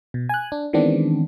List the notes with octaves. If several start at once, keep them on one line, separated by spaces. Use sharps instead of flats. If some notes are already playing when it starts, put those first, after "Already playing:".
B2
G#5 F#6
D4
D#3 E3 G#3 B3 C4 D4